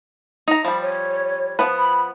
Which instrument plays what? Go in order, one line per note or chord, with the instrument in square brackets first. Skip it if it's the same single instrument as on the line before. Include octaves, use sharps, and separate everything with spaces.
[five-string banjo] D#4 A#5
[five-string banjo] F3 G3 [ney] B5
[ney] C#5
[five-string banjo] F3 B3 B4
[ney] B5